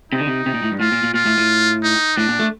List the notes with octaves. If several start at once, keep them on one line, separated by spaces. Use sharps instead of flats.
C3 D#4
D3
C3
C3
A#2
A2
G2
A2 F4
A#2
A#2
A#2 F4
A2
A2
D#4
A2 D4
A#2
A3